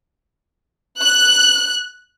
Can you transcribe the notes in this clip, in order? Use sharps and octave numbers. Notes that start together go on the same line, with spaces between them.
F#6